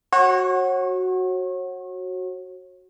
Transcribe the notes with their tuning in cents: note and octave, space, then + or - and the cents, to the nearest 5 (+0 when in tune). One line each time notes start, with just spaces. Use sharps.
F#4 +0 C#5 -35